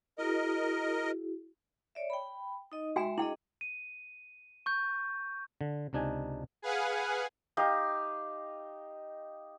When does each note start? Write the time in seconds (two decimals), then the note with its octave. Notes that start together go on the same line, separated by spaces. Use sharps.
0.18 E4 F#4 G#4 A#4 D#5
1.95 C#5 D5 E5
2.10 G5 B5
2.72 D#4 D#5
2.96 G#3 F#4 E5 G5 G#5 C6
3.18 D4 E4 G#4 D#5 G5
3.61 D#7
4.66 C#6 G6
5.61 D3
5.93 C#2 C3 D4 D#4 G#5
6.62 G#4 B4 F5 F#5 G#5
7.57 D#4 G4 F5